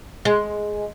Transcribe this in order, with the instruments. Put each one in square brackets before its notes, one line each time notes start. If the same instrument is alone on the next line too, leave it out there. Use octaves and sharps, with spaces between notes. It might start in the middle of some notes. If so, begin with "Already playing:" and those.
[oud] G#3